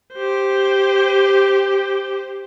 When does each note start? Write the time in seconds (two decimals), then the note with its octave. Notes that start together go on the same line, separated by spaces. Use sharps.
0.14 G4 C5